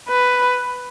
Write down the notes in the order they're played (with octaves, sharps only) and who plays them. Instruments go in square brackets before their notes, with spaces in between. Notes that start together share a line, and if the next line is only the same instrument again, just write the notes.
[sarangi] B4